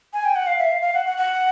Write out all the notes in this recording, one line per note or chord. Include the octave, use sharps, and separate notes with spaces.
G#5
G5
F#5
F5
E5
F5
F5
F#5
F#5
F#5